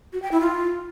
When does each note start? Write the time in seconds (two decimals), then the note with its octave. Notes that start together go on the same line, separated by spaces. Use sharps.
0.13 F#4
0.22 G5
0.32 E4
0.41 F4